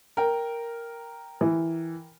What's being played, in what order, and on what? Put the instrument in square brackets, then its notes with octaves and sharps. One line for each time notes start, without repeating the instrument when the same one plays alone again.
[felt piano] A#4 G5
[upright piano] E3